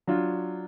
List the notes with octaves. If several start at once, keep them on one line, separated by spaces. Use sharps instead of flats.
F#3 D4 F4